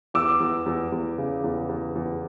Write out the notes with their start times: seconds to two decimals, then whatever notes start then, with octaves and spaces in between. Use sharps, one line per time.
0.14 E2 D6 E6
0.40 E2
0.66 E2
0.92 E2
1.18 C#3
1.44 E2
1.69 E2
1.95 E2